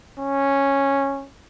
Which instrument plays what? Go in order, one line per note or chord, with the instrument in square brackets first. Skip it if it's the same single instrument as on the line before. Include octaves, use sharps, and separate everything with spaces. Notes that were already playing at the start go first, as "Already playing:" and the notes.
[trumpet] C#4